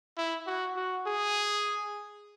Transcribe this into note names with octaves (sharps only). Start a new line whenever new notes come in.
E4
F#4
F#4
G#4